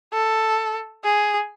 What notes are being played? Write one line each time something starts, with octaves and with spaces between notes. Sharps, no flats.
A4
G#4